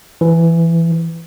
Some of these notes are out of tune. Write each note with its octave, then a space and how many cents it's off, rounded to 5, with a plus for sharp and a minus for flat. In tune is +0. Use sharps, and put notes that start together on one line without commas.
E3 +15